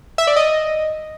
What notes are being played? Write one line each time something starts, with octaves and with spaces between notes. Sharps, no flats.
E5
D5
D#5